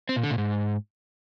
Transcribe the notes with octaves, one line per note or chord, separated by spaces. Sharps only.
C4
A#2
D3
A#2
G#2